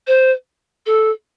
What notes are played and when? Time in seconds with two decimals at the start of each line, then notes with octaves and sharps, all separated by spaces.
0.07 C5
0.86 A4